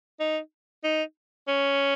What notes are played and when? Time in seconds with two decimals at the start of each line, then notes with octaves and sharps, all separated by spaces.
0.20 D#4
0.84 D#4
1.47 C#4